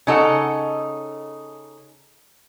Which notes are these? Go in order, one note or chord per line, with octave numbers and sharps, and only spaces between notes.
C#3 D#4 A4 F#5